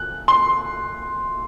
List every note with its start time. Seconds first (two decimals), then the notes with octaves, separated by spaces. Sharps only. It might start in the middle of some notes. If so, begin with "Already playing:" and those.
Already playing: F#6
0.28 C6